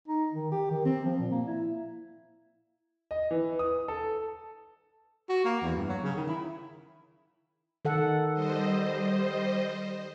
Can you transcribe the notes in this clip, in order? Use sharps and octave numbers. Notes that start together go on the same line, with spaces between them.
D#4
D#3
G4
D#3
C4
F3
A#2
A#3
E4
D#5
E3
D#6
A4
F#4
A#3
E2
G2
F#3
C#3
D#3
E4
D#3 A4 F#5
G3 C5 D#5